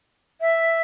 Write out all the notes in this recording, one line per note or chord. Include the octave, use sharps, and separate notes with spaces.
E5